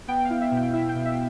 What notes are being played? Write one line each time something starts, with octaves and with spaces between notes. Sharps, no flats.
B3 G5
F5
E4
E5
B2
G5
E4 E5
G5
B2
E5